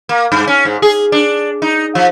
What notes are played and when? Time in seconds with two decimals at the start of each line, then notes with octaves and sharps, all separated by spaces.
0.09 A#3
0.32 G2
0.47 C#4
0.65 G#2
0.82 G#4
1.12 D4
1.62 D#4
1.95 F3